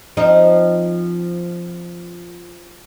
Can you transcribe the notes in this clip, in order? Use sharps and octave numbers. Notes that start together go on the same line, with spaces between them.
F3 C4 D#4